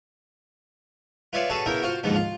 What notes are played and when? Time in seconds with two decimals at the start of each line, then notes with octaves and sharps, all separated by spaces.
1.33 F4 B4 C#5 D5 E5 F5
1.50 C#4 F#4 G#4 A4 B4 A5
1.66 C#3 B3 E4 A#4 G5 D#6
1.83 F4 F#4 C5 F5
2.03 D#2 G#2 D3 F3 G#3 B3
2.15 F4